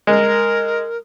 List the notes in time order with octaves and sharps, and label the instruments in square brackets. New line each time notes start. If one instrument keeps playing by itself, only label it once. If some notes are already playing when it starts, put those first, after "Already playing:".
[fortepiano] G#3 [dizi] A#4